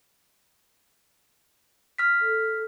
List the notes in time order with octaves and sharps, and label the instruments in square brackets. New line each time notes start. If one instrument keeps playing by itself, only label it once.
[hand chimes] F6 B6
[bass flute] A4